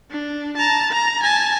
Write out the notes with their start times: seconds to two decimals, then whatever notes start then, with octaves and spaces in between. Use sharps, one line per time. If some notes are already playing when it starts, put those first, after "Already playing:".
0.11 D4
0.57 A5 A#5
0.91 A#5
1.23 G#5 A5